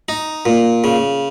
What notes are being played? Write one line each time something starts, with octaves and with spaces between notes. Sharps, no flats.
D#4
A#2
C#3